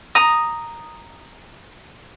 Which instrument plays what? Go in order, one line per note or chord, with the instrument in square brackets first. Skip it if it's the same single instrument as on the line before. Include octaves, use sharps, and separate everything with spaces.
[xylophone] A#5 A#6 [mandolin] D#6